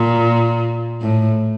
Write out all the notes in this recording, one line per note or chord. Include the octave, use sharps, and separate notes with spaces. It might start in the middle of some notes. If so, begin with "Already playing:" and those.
Already playing: A#2
A2